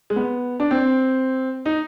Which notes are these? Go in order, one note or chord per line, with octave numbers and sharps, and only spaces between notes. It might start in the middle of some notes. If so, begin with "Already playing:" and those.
G#3
B3
D4
C4
D#4